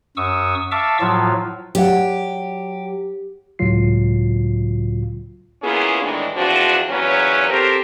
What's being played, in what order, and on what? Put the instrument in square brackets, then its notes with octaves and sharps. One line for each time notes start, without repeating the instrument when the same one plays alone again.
[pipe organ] F#2 C#6 D#6 E6
E5 F5 A5 C#6 D6 E6
A2 F3 F#3 F4
[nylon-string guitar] F#3 D5 F#5 [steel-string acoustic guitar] G4
[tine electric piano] C#2 A2 C#3 F#3 F4 C7
[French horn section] A#3 B3 C#4 E4 F4 G#4
A2 D#3 E3 G#3 D4
E2 F3 C4 D4 F#4
E2 A#2 F#3 C#4 B4 C#5
C4 G4 A4 A#4 C5